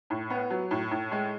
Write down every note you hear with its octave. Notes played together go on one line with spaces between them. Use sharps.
A2
B3
F#3
A2
A2
G#3